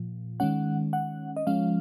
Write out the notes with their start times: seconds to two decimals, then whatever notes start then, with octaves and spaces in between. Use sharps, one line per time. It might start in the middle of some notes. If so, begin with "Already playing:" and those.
Already playing: A#2 F3
0.40 D#3 G#3 C#4 F#5
0.93 F#5
1.37 D#5
1.47 F3 G#3 C#4 F5